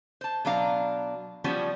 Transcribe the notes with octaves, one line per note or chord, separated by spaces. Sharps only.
C5 A5
B2 F#3 D4 F5 A#5
F3 G3 B3 C#4 F#4